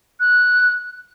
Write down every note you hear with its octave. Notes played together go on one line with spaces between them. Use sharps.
F#6